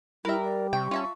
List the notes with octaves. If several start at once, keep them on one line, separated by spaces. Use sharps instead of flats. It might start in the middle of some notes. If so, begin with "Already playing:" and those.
G3 E4 A#4 B4 E5
D5
C3 G5 C#6
C#4 F4 E5 A5